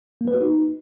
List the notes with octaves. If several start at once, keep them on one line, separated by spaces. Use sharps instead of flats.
A#3
B4
F#4
D#4